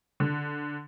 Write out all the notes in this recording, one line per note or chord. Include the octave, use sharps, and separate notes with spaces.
D3